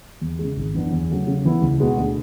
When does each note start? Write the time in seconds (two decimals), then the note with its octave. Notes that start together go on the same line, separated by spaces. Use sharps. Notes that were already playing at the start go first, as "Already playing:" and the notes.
0.21 E2
0.39 C#3 G#3
0.57 G#1
0.74 F#2 E3 B3 D4
0.91 E2
1.09 C#3 F#3 A3
1.27 C#3
1.45 E3 B3 E4
1.62 C#2
1.80 B2 G#3 B3 F#4
1.97 D2